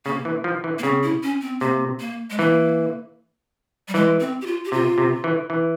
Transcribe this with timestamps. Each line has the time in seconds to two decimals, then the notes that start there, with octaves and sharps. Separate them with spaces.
0.06 C#3 A#3
0.25 E3
0.44 F3
0.64 E3
0.78 A#3
0.83 C#3 C4
1.03 E4
1.23 C#4
1.41 C4
1.61 C3 A#3
2.00 A#3
2.30 G#3
2.39 E3 A#3
3.88 G3
3.94 E3 G#3
4.20 C4
4.41 G4
4.46 F4
4.65 G4
4.72 C3 F4
4.98 C3
5.24 E3
5.50 E3